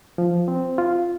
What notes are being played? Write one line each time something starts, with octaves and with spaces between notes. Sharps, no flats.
F3
C4
F4